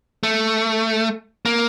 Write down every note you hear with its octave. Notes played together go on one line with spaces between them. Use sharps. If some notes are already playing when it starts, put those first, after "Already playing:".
A3
A#3